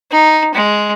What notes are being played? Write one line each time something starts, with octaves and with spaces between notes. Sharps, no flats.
D#4
G#3